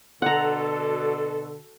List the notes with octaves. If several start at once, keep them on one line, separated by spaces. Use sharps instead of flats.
B2 D3 F#4 A4 F#5 A#5